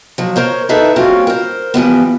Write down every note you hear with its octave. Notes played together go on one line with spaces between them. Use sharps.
F3 F#3
A#4 C5 C#5
D#4 E4 G#4 A4 B4 E5
G3 A#3 C4 C#4 F4 F#4
A#4 C5
E3 F3 G3 B3